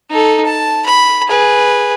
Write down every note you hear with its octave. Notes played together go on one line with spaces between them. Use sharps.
D#4 A4
A5
B5
G#4 B4